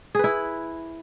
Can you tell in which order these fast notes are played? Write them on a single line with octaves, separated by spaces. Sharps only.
G#4 B4 E4